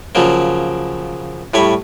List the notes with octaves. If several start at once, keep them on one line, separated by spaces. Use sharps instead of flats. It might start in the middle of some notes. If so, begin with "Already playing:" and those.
C#3 F3 F#3 A#3
A2 G3 C#5 B5